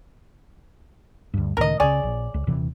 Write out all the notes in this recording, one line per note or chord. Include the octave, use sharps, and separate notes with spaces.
D2 G2
C#2 A2 D#3 A#4 D#5
C#2 C#3 G#4 C#5 D5
A#1
C#2
D#1 C3 E3